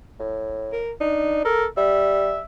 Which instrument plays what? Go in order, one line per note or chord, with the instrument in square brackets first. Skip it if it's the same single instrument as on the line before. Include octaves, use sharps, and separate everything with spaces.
[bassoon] A2
[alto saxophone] A#4
[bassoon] D4 [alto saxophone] D#4
[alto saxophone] A4 [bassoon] A#4
[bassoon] G3 [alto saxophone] E5